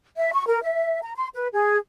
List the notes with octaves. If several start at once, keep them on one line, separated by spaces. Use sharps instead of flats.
E5
C#6
A#4
E5
A#5
C6
B4
G#4